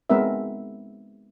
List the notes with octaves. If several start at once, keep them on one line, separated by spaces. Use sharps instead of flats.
G#3 B3 C4 D#4 A#4 E5